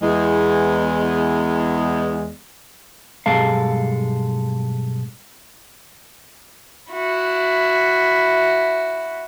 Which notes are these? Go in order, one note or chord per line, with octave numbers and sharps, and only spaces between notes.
E2 G#3
B1 G2 G#3 A4 F5
E4 F#4